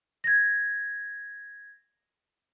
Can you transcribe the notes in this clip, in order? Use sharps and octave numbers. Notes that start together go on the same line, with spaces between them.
G#6 A#6